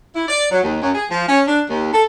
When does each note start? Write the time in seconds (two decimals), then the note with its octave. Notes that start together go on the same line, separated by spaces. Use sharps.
0.15 E4
0.28 D5
0.51 F#3
0.63 D#2
0.82 F#2
0.95 G#4
1.10 F3
1.29 C#4
1.47 D4
1.68 D#2
1.94 A4